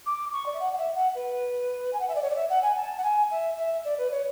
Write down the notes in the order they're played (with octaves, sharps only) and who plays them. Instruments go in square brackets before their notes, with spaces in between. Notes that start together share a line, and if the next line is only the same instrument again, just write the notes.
[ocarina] D6
C#6
D5
E5
F#5
F#5
E5
F#5
B4
G#5
F#5
E5
D5
C#5
D5
E5
F#5
G#5
A5
F#5
G#5
E5
E5
D5
B4
C#5